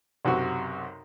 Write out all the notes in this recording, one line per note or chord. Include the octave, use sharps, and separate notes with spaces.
B1 F#2 C3 F#4